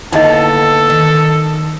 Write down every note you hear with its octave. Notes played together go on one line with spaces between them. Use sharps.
D3 A#3 B3 D#4 E4 A4 D#5
D#3